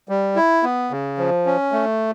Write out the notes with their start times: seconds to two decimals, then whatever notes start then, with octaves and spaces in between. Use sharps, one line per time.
0.09 G3
0.36 E4
0.63 B3
0.91 C#3
1.18 F3
1.46 C#4
1.72 A3